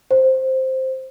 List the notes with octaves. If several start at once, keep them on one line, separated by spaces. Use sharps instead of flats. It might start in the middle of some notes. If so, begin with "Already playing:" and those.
C5